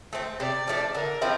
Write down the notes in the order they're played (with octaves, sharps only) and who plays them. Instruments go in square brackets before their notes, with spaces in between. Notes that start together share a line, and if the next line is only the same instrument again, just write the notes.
[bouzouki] A3 C4
[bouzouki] C3 [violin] D5
[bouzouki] F3 A3 D4
[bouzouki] D3 [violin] A#4
[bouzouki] F3 C4 E4